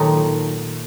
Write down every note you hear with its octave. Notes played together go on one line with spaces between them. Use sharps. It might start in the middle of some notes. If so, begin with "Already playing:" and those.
Already playing: A#2 D#3 F#3 A3 D#4